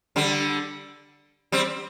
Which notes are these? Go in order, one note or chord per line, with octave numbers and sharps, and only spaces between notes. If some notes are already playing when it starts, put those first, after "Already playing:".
D3 G3
G3 C4